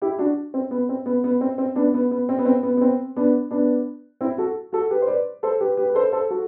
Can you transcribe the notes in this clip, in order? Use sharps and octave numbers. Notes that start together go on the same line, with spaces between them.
E4 G4
D4 F#4
C4
B3
C4
B3
B3
C4
C4
B3 D4
B3
B3
C4
B3
C4
B3
B3
C4
B3 D4
B3 D4
C4 E4
F#4 A4
F#4 A4
G4 B4
C5
B4 D5
A4 C5
G4 B4
G4 B4
B4
A4 C5
A4 C5
F#4 A4